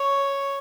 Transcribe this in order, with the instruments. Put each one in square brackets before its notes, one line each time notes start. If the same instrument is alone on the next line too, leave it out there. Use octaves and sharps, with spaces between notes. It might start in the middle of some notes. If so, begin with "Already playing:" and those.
Already playing: [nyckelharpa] C#5